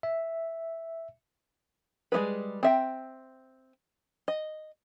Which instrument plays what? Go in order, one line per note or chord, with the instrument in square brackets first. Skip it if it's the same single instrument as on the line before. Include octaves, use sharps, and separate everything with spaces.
[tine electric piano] E5
[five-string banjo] G3 G#3 C#4 G#4 B4
C4 E5 G5
D#5